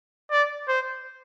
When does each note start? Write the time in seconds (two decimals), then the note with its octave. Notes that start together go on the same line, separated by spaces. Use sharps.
0.31 D5
0.68 C5